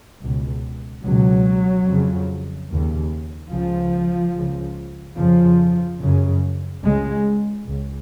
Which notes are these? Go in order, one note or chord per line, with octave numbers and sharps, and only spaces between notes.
C#2 B2
C#2 B2 F#3
F2 C#3
D#2 C#3
C#2 C#3 F3
C#2 C#3
F2 C#3 F3
F#2 C#3
C#2 C#3 G#3
C#2 C#3